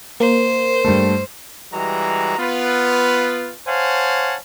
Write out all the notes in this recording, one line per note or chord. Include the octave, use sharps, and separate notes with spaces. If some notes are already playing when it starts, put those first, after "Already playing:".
A#3 C5
G2 A3
E3 G3 G#3 F#4 A#5
B3 F4 B4
C5 C#5 F5 F#5 G#5 A5